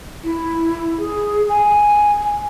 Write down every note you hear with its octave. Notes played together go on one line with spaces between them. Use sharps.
E4
G#4
G#5